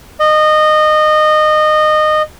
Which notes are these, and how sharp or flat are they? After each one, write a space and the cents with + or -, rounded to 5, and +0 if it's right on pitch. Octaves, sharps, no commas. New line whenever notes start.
D#5 -20